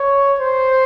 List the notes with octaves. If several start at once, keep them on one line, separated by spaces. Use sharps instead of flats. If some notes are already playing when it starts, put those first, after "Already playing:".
Already playing: C#5
C5